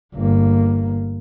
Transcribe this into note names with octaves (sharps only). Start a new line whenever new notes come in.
G1 A#3